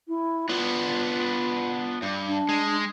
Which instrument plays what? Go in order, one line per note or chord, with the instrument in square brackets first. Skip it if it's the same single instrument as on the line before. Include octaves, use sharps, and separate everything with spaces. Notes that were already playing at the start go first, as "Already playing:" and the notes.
[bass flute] E4
[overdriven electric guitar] B3 D4 [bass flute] F4
[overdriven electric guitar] G2
[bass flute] D4
[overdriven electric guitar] G#3